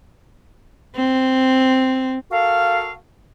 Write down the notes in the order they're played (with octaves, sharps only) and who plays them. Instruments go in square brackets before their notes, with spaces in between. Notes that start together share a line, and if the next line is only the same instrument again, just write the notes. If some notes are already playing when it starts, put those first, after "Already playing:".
[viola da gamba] C4
[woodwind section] F#4 A4 A#4 F5